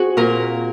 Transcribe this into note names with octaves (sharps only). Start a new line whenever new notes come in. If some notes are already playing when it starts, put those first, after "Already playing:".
Already playing: C4 F#4 G#4
A#2 A#4